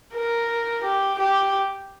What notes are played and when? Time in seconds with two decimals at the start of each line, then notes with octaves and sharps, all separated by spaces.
0.15 A#4
0.84 G4
1.19 G4